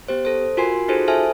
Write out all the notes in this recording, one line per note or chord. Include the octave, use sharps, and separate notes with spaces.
B3 G4 C5
A4 C5
F4 F#4 A#4 G#5 C6 C7
D#4 F4 F#4 G#4 A4 C5
A4 C5 E5 G#5 A5 F6